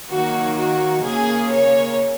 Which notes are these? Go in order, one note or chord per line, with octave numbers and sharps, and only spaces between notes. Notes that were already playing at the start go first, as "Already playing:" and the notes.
D#3 F#3 A#3 F#4
F#4
C#3 A#3 C#4 G#4
C#5